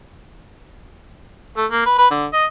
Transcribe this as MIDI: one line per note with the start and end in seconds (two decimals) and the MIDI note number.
1.57 1.65 57
1.71 1.85 58
1.86 1.98 71
1.98 2.09 71
2.11 2.26 50
2.33 2.45 75